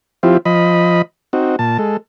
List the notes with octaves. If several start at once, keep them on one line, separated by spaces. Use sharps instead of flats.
F3 C4 E4 F4 G4
F3 D#5 B5
C4 D#4 F#4
A#2 A5
G#3 A4